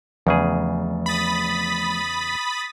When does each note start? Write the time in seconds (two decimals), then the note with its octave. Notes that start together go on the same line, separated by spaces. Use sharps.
0.27 E2 C#3 F3 A3 G#4
1.06 B5 D#6 A6 B6